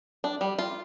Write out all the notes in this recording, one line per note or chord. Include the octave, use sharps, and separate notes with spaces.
D4
G3
F4